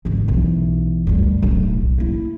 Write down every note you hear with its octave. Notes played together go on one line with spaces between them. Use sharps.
G#1 D2
B1 E3
D2 G2
D1 B1
A#3 E4